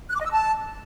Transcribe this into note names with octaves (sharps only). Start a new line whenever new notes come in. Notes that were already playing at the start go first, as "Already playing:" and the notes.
F#6
D6
D#5
E6
A5